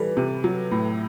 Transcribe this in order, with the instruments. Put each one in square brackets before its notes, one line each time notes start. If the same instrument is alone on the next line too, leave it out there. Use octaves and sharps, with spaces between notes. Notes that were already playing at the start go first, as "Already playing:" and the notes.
Already playing: [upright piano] E3 G3 [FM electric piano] A4 B4
[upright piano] C3
F#3
A2